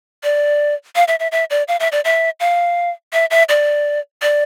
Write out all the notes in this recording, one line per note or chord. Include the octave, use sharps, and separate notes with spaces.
D5
F5
E5
E5
E5
D5
F5
E5
D5
E5
F5
E5
E5
D5
D5